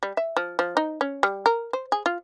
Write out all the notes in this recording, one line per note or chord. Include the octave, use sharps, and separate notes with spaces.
G3
E5
F3
F3
D#4
C#4
G3
A#4
C5
G#4
F4